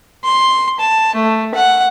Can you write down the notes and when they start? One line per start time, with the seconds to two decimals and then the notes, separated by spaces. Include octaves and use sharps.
0.24 C6
0.80 A5
1.15 A3
1.55 F#5